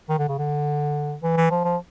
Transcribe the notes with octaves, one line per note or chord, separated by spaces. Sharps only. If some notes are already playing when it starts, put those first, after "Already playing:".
D#3
D3
C#3
D3
E3
E3
F3
F3